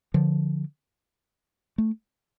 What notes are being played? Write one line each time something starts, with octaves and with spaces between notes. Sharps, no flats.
D3 F3
A3